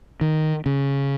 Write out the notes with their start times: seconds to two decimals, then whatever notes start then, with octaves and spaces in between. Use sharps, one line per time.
0.21 D#3
0.66 C#3